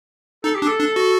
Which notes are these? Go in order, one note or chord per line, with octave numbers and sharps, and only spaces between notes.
D#4 A4
G4
D4
A4
D4
F#4